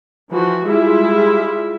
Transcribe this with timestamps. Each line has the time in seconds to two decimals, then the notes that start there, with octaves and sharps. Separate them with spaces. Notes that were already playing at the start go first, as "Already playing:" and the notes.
0.31 E3 F3 F#4
0.67 G3 G#3 E4 F4 E5